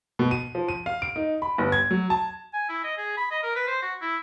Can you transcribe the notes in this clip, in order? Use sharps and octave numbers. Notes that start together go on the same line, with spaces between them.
B2
D#7
F3
D#7
F5
D7
D#4
B5
G1
G#6
F#3
A5
G#5
E4
D#5
G#4
B5
D#5
A#4
B4
C5
F#4
E4